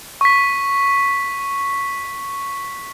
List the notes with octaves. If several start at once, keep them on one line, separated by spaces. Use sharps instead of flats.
C#6 B6